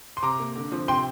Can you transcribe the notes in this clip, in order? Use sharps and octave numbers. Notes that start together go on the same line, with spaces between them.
C6
C3 A#5 D6
A#3
D3
F3 C4
C3 G5 C6